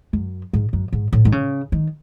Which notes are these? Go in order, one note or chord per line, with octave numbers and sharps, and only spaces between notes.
F#2
G#2
F#2
G#2
A2
D#3
C#3
D#3